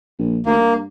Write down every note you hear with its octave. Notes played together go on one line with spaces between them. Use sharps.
A#1
D2 A#3
G2